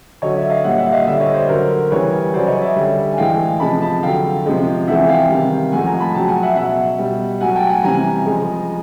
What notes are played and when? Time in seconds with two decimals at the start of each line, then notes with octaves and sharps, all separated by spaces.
0.22 D3 F#3 C#5 D#5
0.36 D5 E5
0.50 D#5 F5
0.64 A#2 G3 E5 F#5
0.78 E5 F#5
0.92 D#5 F5
1.07 D3 G3 D5 E5
1.20 C#5 D#5
1.34 C5 D5
1.49 D3 F#3 A#4 C5
1.91 C#3 E3 G3 B4 C#5
2.34 C#3 F#3 C5 D5
2.47 C#5 D#5
2.62 D5 E5
2.75 D3 G3
3.11 G#5
3.17 A2 E3 G#3 F5 G5
3.60 C3 F3 G#3 A5 B5
3.81 A5 B5
4.03 D3 F#3 F5 G5
4.45 C3 F3 G#3
4.88 C3 E3 G#3 E5 F#5
5.08 F5 G5
5.29 C3 D#3 G3
5.72 A2 F3 G#3 F#5 G#5
5.86 G#5 A#5
6.00 A5 B5
6.14 C#3 F#3 G5 A5
6.28 F#5 G#5
6.43 E5 F#5
6.56 B2 F#3 E5 F#5
6.99 B2 G3
7.40 A2 F#3 F#5 G#5
7.55 G5 A5
7.69 F#5 G#5
7.83 C3 E3 G3 G#5 A#5
8.26 C#3 F3 G#3